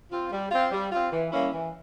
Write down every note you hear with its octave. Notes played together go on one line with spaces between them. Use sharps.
C4 F4
G3
C4 F4
G3
C4 F4
E3
G3 A#3 C#4 E4
E3